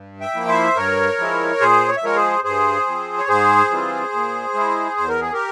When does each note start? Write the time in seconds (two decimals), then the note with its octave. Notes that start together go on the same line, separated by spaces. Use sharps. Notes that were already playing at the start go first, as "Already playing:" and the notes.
Already playing: G2
0.20 E5 G5
0.35 F3 A#3 E4
0.48 C5 E5
0.76 G2 A#4 C#5
1.18 F3 G#3 E4
1.60 A#2 G#4 C5
1.88 C#5
1.97 E5
2.02 F3 G#3 A#4 C#5
2.16 G#4 C5
2.44 G2 G#4 C5
2.87 F3 C4
3.19 C#5
3.28 G#2 G#4 C5
3.70 E3 G3 C4 F4
4.12 A#2
4.54 G#3 E4
4.97 E2 C5
5.09 A#4
5.21 G#4
5.33 G4 A#4